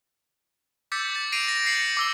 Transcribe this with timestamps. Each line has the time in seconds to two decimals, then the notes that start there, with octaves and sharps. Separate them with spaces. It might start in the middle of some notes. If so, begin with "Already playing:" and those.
0.92 D6 E6 G6 A6 B6 C#7
1.16 A6
1.32 A#6 C7 D7 D#7 F7
1.48 A#6
1.65 G6 C7 C#7 F#7
1.97 D6 E6 G7